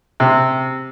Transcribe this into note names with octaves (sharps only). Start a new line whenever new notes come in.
C3